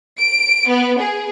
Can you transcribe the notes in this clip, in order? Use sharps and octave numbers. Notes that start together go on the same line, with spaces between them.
D7
B3
G#4